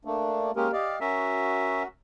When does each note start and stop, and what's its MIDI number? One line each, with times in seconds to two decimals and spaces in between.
0.05 0.51 57
0.05 0.51 58
0.05 0.51 62
0.56 0.68 56
0.56 0.71 58
0.56 0.68 61
0.56 0.71 67
0.56 0.71 70
0.73 0.99 67
0.73 0.96 74
0.73 0.99 75
0.73 0.99 77
1.01 1.83 61
1.01 1.88 66
1.01 1.83 70
1.01 1.83 76